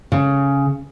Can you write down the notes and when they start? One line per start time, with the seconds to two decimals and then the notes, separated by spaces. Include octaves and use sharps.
0.12 C#3